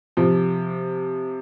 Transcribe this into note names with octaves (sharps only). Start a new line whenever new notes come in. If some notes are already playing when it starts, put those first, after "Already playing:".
C3 F3